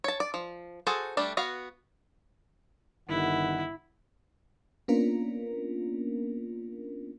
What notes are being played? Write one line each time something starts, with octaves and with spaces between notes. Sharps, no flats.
C#5 A5
D5
F3
F#4 G#4 A4 C5 A5
G3 A3 D4
B3 F#4 F5
G1 D#3 E4 F#5
A#3 B3 C#4 D4 F4 A#4